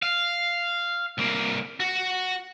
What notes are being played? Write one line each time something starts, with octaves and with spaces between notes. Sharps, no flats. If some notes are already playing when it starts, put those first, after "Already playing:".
F5
C2 A#3
F#4